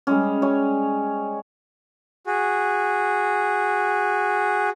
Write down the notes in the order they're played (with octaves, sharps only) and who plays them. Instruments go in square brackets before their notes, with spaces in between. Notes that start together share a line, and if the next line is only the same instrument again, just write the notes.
[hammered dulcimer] G3 G#3 C#4
C#5 G#5
[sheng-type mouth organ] F#4 G#4